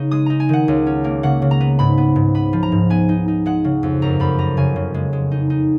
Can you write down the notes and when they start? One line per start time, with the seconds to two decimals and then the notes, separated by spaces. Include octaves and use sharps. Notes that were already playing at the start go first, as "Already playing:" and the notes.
Already playing: C#3 B3 D#4
0.11 G#3 D#6
0.26 D#4 A#5
0.40 G#5
0.49 D#3 F#5
0.68 C#2
0.87 C#4
1.04 A#3
1.23 C#3 F#5
1.42 C#3
1.51 A#5
1.61 B3
1.79 G#2 B5
1.98 B3
2.16 G#2
2.35 B3 B5
2.53 F3
2.63 A#5
2.72 G#2
2.90 B3 G#5
3.09 D#4
3.28 D#4
3.46 G#3 F#5
3.64 C#3
3.83 F2
4.02 F#2 A#5
4.20 F#2 B5
4.38 B3 A#5
4.57 C#3 G#5
4.76 C#3
4.94 G#3
5.13 G#3
5.31 D#4
5.50 D#4